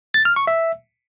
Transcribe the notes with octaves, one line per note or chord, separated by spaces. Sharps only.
A6
F6
C#6
E5